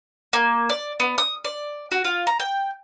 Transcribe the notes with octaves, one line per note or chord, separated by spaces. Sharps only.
A#3
D5
B3
D#6
D5
F#4
F4
A#5
G5